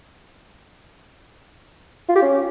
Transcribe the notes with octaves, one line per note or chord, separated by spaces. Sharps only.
F4
G4
C#4